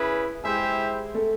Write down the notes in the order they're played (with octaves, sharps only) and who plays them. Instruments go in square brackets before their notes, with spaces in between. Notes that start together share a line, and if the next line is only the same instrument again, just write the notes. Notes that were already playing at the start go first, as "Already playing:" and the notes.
Already playing: [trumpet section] C#4 E4 G#4 B4
[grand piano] G#3 G#4 [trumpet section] E4 G4 C5 E5
[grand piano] A3 A4